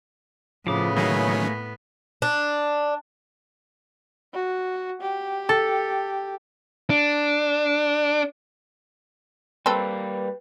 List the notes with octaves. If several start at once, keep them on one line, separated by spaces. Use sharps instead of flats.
A2 C#3 F3 B3 D6
D#3 F#3 A3 A#3 C#4 G#4
D4
F#4
G4
A4
D4
G3 A#3 C4 A4 B4